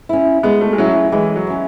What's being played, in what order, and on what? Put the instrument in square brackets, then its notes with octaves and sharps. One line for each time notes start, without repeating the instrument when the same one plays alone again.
[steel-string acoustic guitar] C#4 E4
[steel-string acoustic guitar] G#3 [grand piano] B3
[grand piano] A3
G#3
[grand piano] F#3 [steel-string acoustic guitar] C#4 E4
[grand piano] E3 [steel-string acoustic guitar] G#3
[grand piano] F#3
[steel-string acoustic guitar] C#4 E4